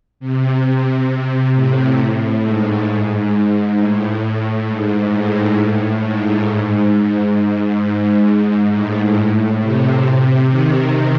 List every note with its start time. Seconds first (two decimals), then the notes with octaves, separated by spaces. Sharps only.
0.20 C3
1.54 A2
2.44 G#2
3.77 A2
4.67 G#2
5.12 A2
6.02 G#2
7.81 G#2
8.71 A2
9.60 C3
10.50 D#3